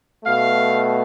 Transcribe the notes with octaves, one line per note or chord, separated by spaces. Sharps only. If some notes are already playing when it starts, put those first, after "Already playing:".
B2 A3 F5